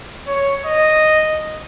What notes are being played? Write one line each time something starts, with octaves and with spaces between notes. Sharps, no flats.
C#5
D#5